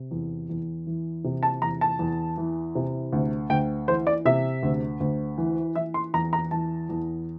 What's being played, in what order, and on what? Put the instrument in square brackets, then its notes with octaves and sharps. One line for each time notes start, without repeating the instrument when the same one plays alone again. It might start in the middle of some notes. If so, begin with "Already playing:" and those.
Already playing: [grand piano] C3
E2
E2
E3
C3
A5
E2 A#5
A5
E2
E3
C3
D2
D2 G5
E3 C5
D5
C3 E5
D2
D2
E3
E3 E5
C6
E2 A#5
A#5
E3 A5
E2